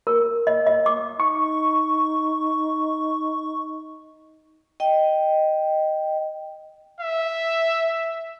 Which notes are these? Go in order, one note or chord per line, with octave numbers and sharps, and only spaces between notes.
A#4
D#5
D#5
D6
D#4 C#6
D#5 G5
E5